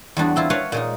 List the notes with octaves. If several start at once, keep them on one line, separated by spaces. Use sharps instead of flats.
E2 G3 D4 F#4
C4 E4 F4
B4 C#5 F5 F#5 A5
A#2 G#3 D#4